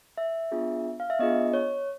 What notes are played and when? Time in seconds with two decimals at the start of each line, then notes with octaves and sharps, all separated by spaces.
0.18 E5
0.52 B3 D4 F4 G#4
1.00 F5
1.10 E5
1.19 B3 D4 F4 G#4 D#5
1.54 C#5